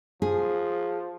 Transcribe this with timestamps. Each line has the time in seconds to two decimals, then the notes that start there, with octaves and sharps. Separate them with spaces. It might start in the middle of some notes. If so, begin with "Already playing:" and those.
0.22 F3 G#4